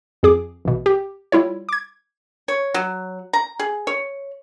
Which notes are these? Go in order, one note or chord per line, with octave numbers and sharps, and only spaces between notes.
F2 G#4 D6
A1 B2
G4
G3 E4 F4 C#5
D6 G#6
C#5
F#3
A#5
G#4
C#5